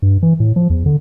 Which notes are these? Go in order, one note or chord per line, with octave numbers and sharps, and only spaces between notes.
G2
E3
A2
F3
E2
D3